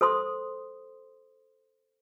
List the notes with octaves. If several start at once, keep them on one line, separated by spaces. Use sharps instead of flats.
A4 C5 C6 D#6